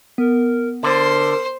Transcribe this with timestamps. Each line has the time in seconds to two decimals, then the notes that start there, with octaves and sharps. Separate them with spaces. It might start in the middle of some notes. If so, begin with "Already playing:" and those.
0.18 B3 A#4
0.83 D3 A#4 C5 C6